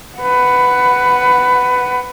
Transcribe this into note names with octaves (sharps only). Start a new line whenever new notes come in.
B4 F#5